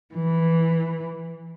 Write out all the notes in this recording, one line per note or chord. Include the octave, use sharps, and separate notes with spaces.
E3